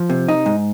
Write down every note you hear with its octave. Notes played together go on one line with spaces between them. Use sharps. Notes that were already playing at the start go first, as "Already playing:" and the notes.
Already playing: F3
C3
D#4
G#2